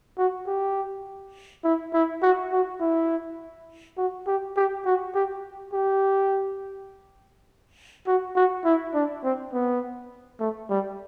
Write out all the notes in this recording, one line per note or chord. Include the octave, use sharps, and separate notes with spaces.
F#4
G4
E4
E4
F#4
F#4
E4
F#4
G4
G4
F#4
G4
G4
F#4
F#4
E4
D4
C4
B3
A3
G3